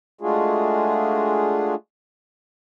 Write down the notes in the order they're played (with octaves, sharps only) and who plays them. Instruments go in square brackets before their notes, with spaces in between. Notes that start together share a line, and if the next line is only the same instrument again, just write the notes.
[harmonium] G#3 A3 D4 F4 F#4 G#4